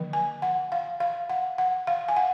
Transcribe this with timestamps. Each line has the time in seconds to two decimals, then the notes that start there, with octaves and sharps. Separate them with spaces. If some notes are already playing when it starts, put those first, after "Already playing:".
Already playing: D3 F3 A#3
0.13 G#5
0.42 F#5
0.72 F5
1.00 F5
1.29 F#5
1.58 F#5
1.87 F5
2.08 G#5
2.17 F#5